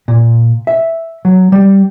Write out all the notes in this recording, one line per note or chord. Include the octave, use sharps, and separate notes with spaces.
A#2
E5
F#3
G3